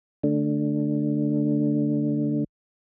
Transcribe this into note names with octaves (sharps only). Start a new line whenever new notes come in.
D3 A3 D4